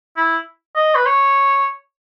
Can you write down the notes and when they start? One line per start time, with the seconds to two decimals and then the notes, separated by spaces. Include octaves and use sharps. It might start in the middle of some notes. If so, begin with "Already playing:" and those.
0.17 E4
0.76 D#5
0.95 B4
1.06 C#5